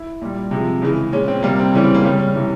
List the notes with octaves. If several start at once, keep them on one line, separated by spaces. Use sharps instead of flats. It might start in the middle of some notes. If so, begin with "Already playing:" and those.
Already playing: E4
A#2 G3
C3 F3 G#3
C#3 E3 G#3
A#2 G#3 C#4
C4
C3 G3 A#3
C4
C#3 E3 G3 C#4
C4
A#3
C#3 G3 C#4
C#4
C3 E3 G3